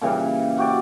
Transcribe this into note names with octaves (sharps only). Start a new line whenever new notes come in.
A#2 C#3 E3 G3
F#4 G4 D5